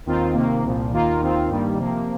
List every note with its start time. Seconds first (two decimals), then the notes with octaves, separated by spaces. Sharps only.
0.06 D#2 D#3 C4 F4
0.34 C3 D#3 A#3
0.63 C2 A#2 F3
0.91 D#2 D#3 A#3 F4
1.20 D#2 D#3 C4 F4
1.49 G2 D#3 G3 A#3
1.77 C3 F3 A#3